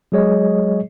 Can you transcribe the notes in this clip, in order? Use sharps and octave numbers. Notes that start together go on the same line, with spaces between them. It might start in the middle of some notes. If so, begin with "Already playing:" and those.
F#3 G#3 G#4 C#5 D#5